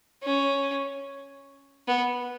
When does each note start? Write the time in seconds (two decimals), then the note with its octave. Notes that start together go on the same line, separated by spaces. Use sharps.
0.23 C#4
1.88 B3